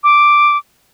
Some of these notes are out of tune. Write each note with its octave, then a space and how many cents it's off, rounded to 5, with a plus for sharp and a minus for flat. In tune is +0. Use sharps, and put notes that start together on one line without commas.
D6 +0